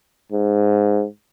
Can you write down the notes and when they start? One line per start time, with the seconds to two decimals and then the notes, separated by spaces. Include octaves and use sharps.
0.32 G#2